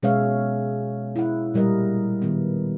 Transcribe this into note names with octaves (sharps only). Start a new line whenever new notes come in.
B2 G#3 C#4 C#5 E5 F5
E4 F#5
A#2 G3 A#4 D#5
D#3 B3